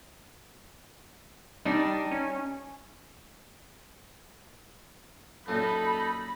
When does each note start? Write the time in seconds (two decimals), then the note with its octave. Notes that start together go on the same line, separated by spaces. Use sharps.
1.65 G3 D4 D#4
2.11 C#4
5.48 F#2 A#2 D#4 A4 B5